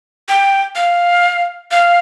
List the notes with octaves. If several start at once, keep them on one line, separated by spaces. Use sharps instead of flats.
G5
F5
F5